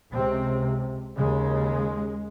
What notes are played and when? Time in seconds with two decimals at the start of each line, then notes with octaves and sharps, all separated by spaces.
0.12 C#2 C3 C4
1.16 D#2 C#3 G#3